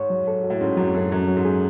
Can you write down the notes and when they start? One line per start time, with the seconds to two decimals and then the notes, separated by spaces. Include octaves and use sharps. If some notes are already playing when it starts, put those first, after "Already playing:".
Already playing: G#2 C#5
0.10 F#3
0.28 A4
0.43 F#4
0.50 A2
0.61 G#2 C#4
0.77 F#2 F#3
0.94 F#2 A4
1.12 F#2 F#3
1.28 F#3
1.36 G#2
1.45 G#4